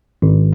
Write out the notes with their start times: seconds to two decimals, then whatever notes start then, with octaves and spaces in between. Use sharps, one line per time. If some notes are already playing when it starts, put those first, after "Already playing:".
0.22 G#1